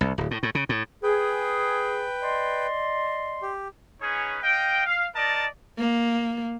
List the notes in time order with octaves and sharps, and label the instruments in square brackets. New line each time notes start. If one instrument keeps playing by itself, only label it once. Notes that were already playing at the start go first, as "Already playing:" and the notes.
[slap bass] C2
D1
A2
A2
C#3
A2
[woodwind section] G#4 [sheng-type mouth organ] B4 G5
[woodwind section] D5 D#5 C6
[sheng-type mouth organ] G4
[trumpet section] C#4 D#4 G#4 B4 C#5
D#5 F5 G5
F5
D#4 A#4 D5 D#5 A5
[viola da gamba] A#3